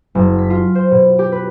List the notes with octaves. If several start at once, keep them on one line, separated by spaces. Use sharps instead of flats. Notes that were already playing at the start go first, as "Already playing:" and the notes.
F#1
B6
F4
C5
B2
G4
B4